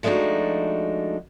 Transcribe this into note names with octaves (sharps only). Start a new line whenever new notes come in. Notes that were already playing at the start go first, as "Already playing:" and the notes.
F3 G#3 A3 D4 D#4 F#4